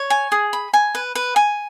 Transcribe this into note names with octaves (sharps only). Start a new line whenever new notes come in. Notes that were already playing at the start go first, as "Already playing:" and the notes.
Already playing: C#5
G#5
G#4
B5
G#5
B4
B4
G#5